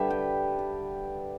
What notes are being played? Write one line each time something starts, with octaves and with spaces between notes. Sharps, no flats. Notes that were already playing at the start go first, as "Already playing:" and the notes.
Already playing: D3 G3 G4 A4 B4 E5
G5
D5